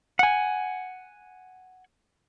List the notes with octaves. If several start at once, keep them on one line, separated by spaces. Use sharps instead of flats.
F#5 G#5